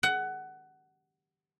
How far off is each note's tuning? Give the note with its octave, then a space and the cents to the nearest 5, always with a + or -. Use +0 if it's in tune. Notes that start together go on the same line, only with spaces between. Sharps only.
F#5 +20